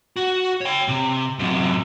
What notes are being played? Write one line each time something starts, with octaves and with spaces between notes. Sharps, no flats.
F#4
C#5 G5
C3
F#2 C3